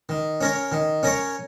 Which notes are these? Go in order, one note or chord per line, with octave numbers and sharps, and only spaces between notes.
D#3
C#4 A#4 C#5
D#3
C#4 A#4 C#5